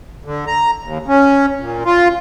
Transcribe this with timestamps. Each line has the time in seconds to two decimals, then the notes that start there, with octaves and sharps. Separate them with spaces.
0.25 D3
0.47 A#5
0.84 D#2
1.08 C#4
1.60 A#2
1.85 F4